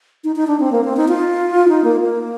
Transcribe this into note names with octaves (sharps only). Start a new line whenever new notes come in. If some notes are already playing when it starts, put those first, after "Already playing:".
D#4
D#4
D4
C4
A#3
C4
D#4
F4
D#4
A#3
A#3